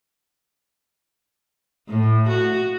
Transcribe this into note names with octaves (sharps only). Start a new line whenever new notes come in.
A2
F#4